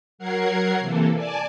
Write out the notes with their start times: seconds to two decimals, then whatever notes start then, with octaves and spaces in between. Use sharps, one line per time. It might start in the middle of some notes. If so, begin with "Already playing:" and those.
0.18 F#3 A#4 F#5 G#6 C7
0.80 C3 E3 A#3 A4
1.14 D5 G#5 A5 D6